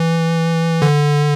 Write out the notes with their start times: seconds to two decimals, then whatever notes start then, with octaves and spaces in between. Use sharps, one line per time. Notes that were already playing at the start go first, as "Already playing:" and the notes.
Already playing: E3
0.82 D3